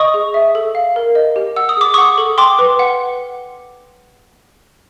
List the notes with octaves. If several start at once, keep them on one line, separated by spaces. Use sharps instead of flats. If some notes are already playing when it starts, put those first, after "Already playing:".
Already playing: D#5 C#6 D#6
G#4
E5
A4
F5
A#4
D#5
G4
F#5 E6
D#6
G#4 D6
F#5 C#6 D#6
A4
G5 C6 D6
B4
F#5